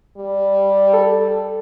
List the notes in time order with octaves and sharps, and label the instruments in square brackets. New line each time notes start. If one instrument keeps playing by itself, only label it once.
[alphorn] G3
[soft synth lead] A4